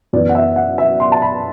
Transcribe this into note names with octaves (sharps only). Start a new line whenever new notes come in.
F#2 E3 B3 D5
F#5
E5
F#5
E5
C6
A5
B5